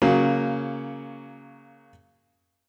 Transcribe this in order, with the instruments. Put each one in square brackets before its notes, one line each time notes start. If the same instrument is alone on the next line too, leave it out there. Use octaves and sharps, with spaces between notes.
[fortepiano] C#3 F#3 A#3